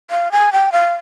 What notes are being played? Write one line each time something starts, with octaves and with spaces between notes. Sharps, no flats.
F5
G#5
G5
F5